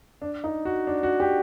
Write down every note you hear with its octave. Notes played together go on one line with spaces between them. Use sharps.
D4
D#4
F#4
D4
F#4
G4